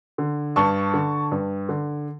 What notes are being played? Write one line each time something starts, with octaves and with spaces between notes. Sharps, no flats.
D3
G2 A5 C#6
D3
G2
D3